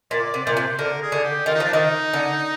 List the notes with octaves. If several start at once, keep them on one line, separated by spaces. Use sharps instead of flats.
A#2 D5
C3
A#2 C5
C3
D3 A#4
G#4
D3
G4
D#3 F4
D#4
F3 D4
D#3 D#4
D3